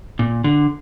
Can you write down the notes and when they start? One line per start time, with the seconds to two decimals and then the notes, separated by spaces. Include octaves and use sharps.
0.19 A#2
0.44 D3